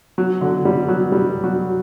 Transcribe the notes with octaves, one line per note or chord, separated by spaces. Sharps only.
F#3
D3
G3
F#3
G3
F#3